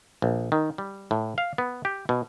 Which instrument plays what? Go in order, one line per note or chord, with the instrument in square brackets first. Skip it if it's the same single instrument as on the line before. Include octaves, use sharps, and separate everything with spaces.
[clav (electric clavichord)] A#1
D#3
G3
A2
F5
B3
G4
B2